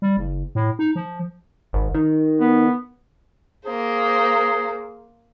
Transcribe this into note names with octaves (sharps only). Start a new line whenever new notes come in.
G3
F#1
A2
D#4
F3
G#1
D#3
B3
A#3 G#4 C5